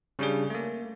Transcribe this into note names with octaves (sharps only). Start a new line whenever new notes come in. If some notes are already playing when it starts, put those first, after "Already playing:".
C#3 G3 C#4 D4 G#4
A3 A#3